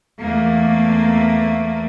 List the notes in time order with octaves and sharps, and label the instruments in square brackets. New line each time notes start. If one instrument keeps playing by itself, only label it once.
[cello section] E2 A3 A#3